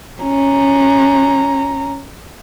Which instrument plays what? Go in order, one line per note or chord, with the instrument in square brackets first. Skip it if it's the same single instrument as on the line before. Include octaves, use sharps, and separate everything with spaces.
[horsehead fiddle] C#4 A#5